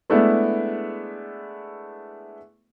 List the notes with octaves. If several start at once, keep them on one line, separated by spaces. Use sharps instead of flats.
G#3 A3 B3 D4 E4